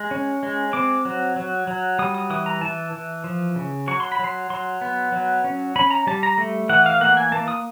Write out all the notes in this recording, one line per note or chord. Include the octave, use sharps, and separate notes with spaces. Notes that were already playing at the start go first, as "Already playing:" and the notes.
Already playing: G#3
C#4
G#3
C4 D6
F#3
F#3
F#3
G3 D#6
D#6
E3 D#6
A#5
E3 A5
E3
F3
C#3
F#3 C#6
C6
B5
F#3
C6
F#3 C6
B3
F#3
C#4
C#4 B5
A#5
G3 A5
A#5
A3
E3 F#5
F5
A#3 F#5
G#5
A#3 A5
D#6